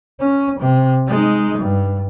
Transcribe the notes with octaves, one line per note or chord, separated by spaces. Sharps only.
C#4
C3
G#3 D#4
G2